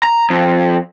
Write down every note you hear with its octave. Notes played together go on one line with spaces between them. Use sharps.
A#5
F2